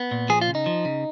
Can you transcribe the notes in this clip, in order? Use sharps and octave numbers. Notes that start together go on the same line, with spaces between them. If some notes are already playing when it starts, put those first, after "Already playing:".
Already playing: B3
A#2
F3 G#4
F4
C#3
D#4
F3
C#3